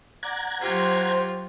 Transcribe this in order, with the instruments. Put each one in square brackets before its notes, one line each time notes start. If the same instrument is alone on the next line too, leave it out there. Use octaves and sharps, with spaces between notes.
[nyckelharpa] D5 [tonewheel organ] F#5 A#5 G#6
[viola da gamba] F#3 G4 [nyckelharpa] F4 [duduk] C5